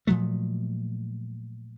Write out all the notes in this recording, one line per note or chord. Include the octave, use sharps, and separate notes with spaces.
A#2 F3 F#3 A3